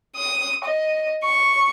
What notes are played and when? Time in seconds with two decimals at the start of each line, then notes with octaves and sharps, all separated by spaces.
0.16 D#6
0.65 D#5
1.24 C#6